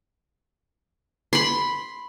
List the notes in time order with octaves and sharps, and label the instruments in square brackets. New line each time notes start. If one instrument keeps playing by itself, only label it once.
[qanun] B5 C6